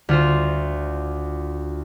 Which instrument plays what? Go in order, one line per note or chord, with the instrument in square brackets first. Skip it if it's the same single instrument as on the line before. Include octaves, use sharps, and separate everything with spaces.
[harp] D2 F4 C5